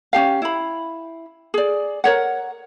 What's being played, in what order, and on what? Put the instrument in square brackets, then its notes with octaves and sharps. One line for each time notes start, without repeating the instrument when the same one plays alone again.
[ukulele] C#4 D4 G4 F5
E4 B5
G#4 D5
A#4 C#5 F#5